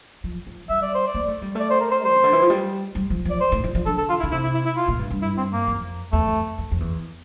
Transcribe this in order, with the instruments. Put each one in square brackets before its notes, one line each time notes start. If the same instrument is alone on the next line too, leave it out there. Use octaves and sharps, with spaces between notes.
[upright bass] F3
F3
[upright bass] G3 [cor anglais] E5
[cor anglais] D5
C5
D5
[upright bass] A#3
A3
G3
[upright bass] A3 [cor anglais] D5
[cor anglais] C5
A#4
C5
C5
[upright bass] C3
D3
E3
F3
G3
G3
F3
[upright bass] F3 [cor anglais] D5
[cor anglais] C5
[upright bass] A2
F3
F3
[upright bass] D3 [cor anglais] A4
[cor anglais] A4
F4
E4
[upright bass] D3
[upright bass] C3 [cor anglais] E4
[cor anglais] E4
E4
E4
F4
[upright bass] A#2
G2
G2
[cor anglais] E4
C4
A#3
[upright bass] F2
[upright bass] E2 [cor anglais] A3
[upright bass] F2
F2
F2
E2